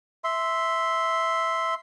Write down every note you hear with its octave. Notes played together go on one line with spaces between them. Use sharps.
E5 C6